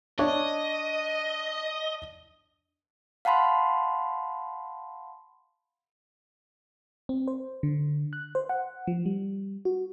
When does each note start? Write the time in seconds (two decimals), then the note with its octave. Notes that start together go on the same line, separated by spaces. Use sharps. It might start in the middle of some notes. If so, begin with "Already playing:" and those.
0.19 D4 C#5 D#5
3.25 F5 F#5 A5 B5 C6
7.09 C4
7.28 C5
7.63 D3
8.13 F#6
8.35 C5
8.49 F#5
8.87 F3
9.06 G3
9.65 F#4